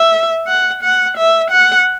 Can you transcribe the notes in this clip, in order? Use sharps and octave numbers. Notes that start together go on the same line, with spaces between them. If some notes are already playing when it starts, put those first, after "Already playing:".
Already playing: E5
F#5
F#5
E5
F#5